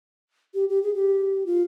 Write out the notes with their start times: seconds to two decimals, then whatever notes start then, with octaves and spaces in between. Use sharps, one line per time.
0.54 G4
0.69 G4
0.83 G#4
0.95 G4
1.46 F4